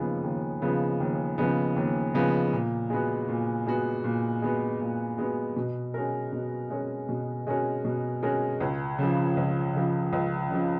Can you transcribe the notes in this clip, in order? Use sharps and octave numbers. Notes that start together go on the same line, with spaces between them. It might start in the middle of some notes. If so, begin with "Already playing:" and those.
Already playing: D#2 C#3 F3 G#3 B3
D#2
C#3 F3 G#3 B3
D#2
C#3 F3 G#3 B3
D#2
C#3 F3 G#3 B3
A#2
G#3 B3 F#4
A#2
G#3 B3 F#4
A#2
G#3 B3 F#4
A#2
G#3 B3 F#4
B2
G#3 C#4 F#4 A#4
B2
G#3 C#4 F#4 A#4
B2
G#3 C#4 F#4 A#4
B2
G#3 C#4 F#4 A#4
C#2
C#3 F3
C#2
C#3 F3
C#2
C#3 F3